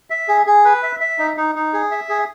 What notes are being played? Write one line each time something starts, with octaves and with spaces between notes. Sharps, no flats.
E5
G#4
G#4
B4
E5
E5
D#4
D#4
D#4
G#4
E5
G#4